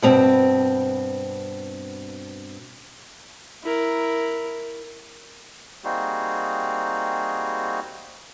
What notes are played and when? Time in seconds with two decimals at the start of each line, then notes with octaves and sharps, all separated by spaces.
0.02 G2 B2 C4
3.63 E4 A#4
5.84 G3 A#3 C4 D#4 F#4 G#4